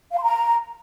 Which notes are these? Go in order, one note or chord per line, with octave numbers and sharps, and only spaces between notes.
F5
C6
A#5